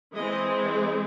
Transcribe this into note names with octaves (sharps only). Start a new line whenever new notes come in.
E3 G#3 C4 D#5